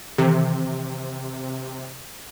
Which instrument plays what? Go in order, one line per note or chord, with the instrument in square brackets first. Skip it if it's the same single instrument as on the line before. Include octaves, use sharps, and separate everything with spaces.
[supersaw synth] C3 [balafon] D#3 E3